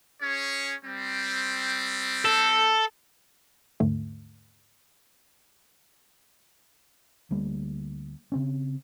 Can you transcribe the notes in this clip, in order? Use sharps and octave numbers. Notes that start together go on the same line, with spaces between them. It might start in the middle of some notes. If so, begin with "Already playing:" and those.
C#4 G#4 C#5
G3 C4
A4
D#2 G#2 D3 A3
D2 G3 A#3
C#3 C4 C#4